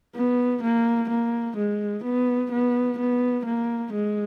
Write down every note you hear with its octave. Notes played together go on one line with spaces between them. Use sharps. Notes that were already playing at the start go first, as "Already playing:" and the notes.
B3
A#3
A#3
G#3
B3
B3
B3
A#3
G#3